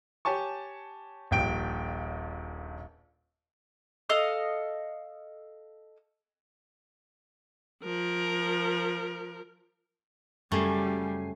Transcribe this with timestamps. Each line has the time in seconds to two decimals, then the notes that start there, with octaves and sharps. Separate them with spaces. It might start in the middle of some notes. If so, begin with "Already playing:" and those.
0.25 G4 C#5 G#5 A5 C#6
1.31 D#1 A#1 G5 D7
4.09 A4 D#5 F5 D#6
7.84 F3 A#4
10.52 F#2 C#3 G3 A3 G#5 C7